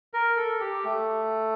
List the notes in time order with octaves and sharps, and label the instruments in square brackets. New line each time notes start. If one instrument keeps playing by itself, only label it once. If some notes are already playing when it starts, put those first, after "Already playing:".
[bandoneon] A#4
A4
G4
A3